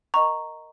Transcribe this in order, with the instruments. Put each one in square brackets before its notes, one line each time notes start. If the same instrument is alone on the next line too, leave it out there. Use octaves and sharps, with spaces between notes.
[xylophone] A#4 D#5 F#5 A#5 C#6